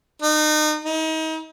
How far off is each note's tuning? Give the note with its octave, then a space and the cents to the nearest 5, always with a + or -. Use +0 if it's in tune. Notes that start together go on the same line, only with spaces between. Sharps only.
D#4 -30
D#4 +35